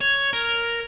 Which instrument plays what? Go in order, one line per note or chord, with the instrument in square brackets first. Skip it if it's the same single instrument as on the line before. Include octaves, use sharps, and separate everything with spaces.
[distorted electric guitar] C#5
A#4